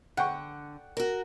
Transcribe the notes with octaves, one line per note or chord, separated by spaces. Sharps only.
D3 F#5 G5 C#6
F#4 A#4